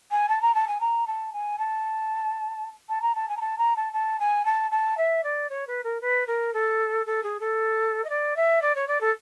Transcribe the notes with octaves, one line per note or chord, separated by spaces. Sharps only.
G#5
A5
A#5
A5
G#5
A#5
A5
G#5
A5
A5
A#5
A5
G#5
A#5
A5
A#5
A5
A5
G#5
A5
A5
E5
D5
C#5
B4
A#4
B4
A#4
A4
A4
G#4
A4
D#5
D5
E5
D5
C#5
D5
A4